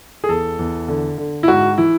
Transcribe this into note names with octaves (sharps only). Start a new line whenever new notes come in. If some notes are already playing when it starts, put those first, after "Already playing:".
G#4
E2 A4
E2
D3
D3
E4
G#2 F#4
E3 E4